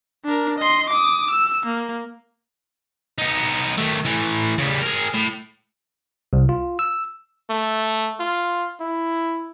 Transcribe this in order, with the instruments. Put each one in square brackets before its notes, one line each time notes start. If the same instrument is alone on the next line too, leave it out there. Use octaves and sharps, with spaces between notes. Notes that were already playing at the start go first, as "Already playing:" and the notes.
[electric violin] D4 A#4
D#5 C6
D6 D#6
E6
A#3
[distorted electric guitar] B3 D#4
D#3 A3
E3 A3
C#3 G3
G#4 A#4
A2
[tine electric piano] C2
F4
E6
[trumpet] A3
F4
E4